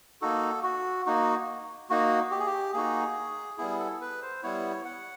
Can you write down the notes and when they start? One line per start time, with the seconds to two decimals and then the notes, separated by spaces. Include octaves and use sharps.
0.21 A#3 D#4 F#4 A4
0.63 F#4
1.06 A#3 D#4 F#4
1.90 A#3 D#4 F#4
2.31 G4
2.39 G#4
2.46 G4
2.74 A#3 D#4 F#4 G#4
3.58 G3 B3 E4 G#4
3.79 A4
4.01 B4
4.22 C5
4.43 G3 B3 E4 C#5
4.85 F#5